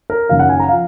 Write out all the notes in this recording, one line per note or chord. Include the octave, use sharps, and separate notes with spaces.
A#4
F#1 F#2 D#3 F#3 F5
F#5
G#5
A#5
F3 F5